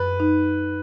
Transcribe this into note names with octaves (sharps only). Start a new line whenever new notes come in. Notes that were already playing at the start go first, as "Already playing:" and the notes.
Already playing: F#2 B4
D#4